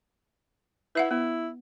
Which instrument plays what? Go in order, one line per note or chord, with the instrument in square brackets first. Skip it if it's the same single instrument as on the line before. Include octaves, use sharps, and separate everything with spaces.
[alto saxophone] E4 [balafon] B4 E5 F#5
[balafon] B3 [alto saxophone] E4